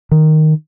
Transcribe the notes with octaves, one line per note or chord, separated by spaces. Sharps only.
D#3